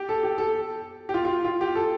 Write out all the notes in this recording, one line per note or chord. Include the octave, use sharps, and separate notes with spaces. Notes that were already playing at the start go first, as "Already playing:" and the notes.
Already playing: G4
A4
G4
A4
G4
F4
F4
F4
G4
A4